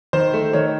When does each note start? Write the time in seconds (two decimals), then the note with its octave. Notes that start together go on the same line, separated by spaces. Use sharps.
0.13 D#3 C5
0.33 A3
0.53 D#3 C#5